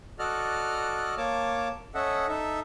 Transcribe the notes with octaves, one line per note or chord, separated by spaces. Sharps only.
F#4 A4 D5 D#5 F6 F#6
A#3 C#5 A5 D6
C#4 A4 D#5 E5 F#5
D#4 A4 E5